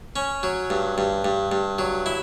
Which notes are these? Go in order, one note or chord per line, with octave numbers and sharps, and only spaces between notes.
C#4
F#3
G2
G2
G2
G2
F#3
E4